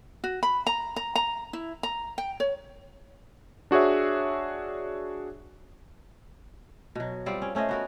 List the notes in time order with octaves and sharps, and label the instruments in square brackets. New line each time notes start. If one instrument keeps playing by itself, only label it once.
[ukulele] F#4
B5
A#5
A#5
A#5
E4
A#5
G5
C#5
[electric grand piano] D4 F#4 G#4 C#5 E5
[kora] B2 F#3
G3 C4 F4 D5
C#4
A3 C#4 C5 D#5
B3 F#4 A#4